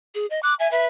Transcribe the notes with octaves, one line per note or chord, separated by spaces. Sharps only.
G#4
D#5
D6 F#6
E5 G#5
B4 E5